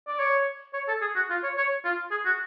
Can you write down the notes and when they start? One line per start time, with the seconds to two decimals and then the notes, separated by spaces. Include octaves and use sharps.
0.08 D5
0.19 C#5
0.74 C#5
0.88 A4
1.01 G#4
1.16 F#4
1.30 F4
1.43 C#5
1.57 C#5
1.85 F4
2.11 G#4
2.26 F#4